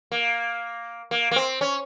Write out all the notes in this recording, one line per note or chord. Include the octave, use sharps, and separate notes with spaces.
A#3
A#3
A#3
C4
C#4